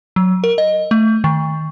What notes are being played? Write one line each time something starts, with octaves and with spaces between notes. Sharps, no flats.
F#3
A#4
D#5
A3
D#3